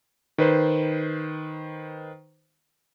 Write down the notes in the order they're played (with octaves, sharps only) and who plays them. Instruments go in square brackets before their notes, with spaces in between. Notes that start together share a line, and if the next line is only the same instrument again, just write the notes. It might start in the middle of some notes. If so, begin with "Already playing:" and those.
[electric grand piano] D#3 B4 C5